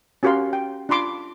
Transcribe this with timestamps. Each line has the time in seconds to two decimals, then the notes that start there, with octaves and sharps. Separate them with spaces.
0.23 C#4 F#4 G4 A#4 F5 C6
0.53 G5
0.89 D4 F4 B5 C6 D6